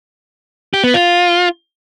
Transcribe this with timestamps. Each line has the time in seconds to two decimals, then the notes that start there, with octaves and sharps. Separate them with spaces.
0.74 G4
0.84 B3
0.94 F4